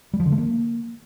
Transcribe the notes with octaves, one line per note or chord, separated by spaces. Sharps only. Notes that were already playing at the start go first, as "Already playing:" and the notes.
G3
F3
D3
A3
A#3